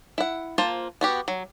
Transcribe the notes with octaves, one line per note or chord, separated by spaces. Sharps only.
E4 F#5
A#3 F4 C5 A5
B3 F#4 G4
F#3